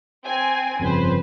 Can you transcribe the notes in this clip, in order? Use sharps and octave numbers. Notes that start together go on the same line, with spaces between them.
C4 G#5
G1 F2 C#3 B4 C5